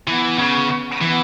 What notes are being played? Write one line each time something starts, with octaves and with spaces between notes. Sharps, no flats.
E3 B3
C#3
E3 B3